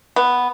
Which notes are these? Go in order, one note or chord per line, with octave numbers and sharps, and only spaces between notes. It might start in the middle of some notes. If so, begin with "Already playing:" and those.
B3